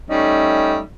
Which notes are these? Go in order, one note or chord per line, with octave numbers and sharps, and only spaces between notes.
G3 A3 C#4 D#4